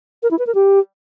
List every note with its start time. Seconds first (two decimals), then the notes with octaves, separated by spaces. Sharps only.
0.23 A#4
0.31 E4
0.39 B4
0.47 A#4
0.55 G4